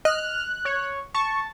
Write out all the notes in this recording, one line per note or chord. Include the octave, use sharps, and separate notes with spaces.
D#5 F6 F#6
C#5
A5 C#6